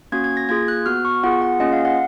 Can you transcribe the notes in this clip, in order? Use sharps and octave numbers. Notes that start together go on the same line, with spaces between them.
A#3 C#4 F#4 G#6
G#6
A#6
A#3 F4 G#4 G#6
F#6
B3 F#4 F6
C#6
B3 F4 G#4 F#5
F#5
A#3 C#4 F4 G#4 D#5
F5
F#5